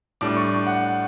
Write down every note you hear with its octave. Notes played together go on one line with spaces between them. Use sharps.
A2 G3 D4 D6
C#6
F#5